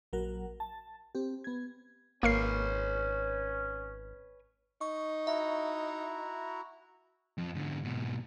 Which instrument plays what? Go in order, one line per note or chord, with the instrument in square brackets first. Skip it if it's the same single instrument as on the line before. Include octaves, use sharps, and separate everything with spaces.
[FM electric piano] A#1 F#3 A#4 F#5
A5
C4 G4
B3 G#6
[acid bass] G#1 [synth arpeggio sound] A#3 A#4 C7 [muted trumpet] C#4 [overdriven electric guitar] B4 C#5
[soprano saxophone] D#4 [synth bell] C#6
[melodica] E4 F#4 A#5 [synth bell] E5
[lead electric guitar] F2
G#2 D3
G#2 B2